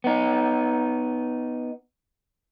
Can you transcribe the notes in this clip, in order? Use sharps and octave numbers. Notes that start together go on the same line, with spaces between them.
B3 D#4